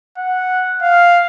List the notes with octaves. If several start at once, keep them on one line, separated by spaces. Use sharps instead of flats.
F#5
F5